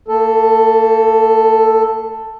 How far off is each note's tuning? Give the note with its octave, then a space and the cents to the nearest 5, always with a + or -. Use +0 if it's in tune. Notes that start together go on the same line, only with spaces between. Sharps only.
A#3 -45 A4 +5